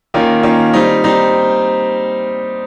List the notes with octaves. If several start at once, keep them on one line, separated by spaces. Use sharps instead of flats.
D#3 A#3 C#4 F4
D#3 A#3 C#4 F4
G3 C4 D#4
G3 C4 D#4